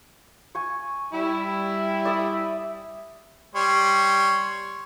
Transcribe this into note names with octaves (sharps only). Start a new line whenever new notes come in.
G#5 C#6
G3 E4
D5 E5 D#6
G3 C#5 C6